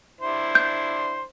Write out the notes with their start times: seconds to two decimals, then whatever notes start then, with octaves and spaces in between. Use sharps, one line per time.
0.21 D4 E4 C5
0.55 G6